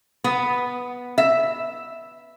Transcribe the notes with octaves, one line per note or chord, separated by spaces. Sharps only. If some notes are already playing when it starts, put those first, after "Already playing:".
B3
E5